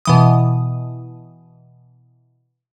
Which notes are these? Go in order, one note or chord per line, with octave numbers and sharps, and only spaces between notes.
B2 E3 D#6